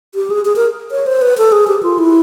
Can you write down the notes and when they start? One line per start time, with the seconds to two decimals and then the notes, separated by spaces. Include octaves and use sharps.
0.15 G4
0.30 G#4
0.45 G#4
0.56 A#4
0.91 C#5
1.06 C5
1.22 B4
1.38 A4
1.52 G#4
1.68 G4
1.83 F4
1.98 E4